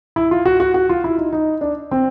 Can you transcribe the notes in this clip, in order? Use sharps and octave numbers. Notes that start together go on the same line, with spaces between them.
E4
F4
F#4
F#4
F#4
F4
E4
D#4
D#4
D4
C4